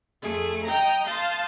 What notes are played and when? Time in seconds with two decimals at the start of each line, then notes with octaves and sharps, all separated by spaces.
0.22 F2 A3 G#4
0.64 D#5 G5 A#5
1.05 F5 A5 C6 D#6 G6